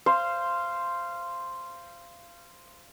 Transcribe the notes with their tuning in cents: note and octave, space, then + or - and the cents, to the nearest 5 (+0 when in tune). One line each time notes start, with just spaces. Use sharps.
C5 +0 F5 -20 C6 +0